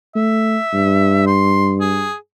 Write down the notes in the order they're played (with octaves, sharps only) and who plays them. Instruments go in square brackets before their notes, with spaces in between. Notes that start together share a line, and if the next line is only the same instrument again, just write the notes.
[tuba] A3 [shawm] E5
[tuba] G2
[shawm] C6
G#4